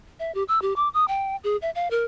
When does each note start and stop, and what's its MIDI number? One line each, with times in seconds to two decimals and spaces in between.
0.20 0.33 76
0.35 0.43 67
0.48 0.61 88
0.62 0.73 67
0.76 0.89 86
0.94 1.07 87
1.08 1.36 79
1.44 1.57 68
1.62 1.70 76
1.75 1.90 77
1.91 2.05 70